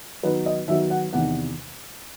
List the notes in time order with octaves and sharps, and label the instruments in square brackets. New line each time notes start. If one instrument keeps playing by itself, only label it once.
[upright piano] D#3 F#3 B3 D#4 B4
D#5
D#3 F#3 B3 D#4 E5
F#5
E2 C3 D#3 F#5